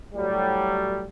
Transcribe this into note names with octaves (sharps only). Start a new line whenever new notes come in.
A2 F#3 G3